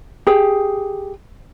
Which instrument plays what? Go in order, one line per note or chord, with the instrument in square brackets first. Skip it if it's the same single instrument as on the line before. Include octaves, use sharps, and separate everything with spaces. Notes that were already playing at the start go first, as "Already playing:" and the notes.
[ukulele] G4 G#4